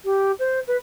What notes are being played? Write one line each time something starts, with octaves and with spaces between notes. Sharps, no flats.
G4
C5
B4